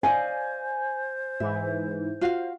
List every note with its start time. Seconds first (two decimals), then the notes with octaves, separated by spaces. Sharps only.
0.03 C5 D5 D#5 F5 G#5
1.40 G#2 E3 E5
2.21 F4 F#4 F5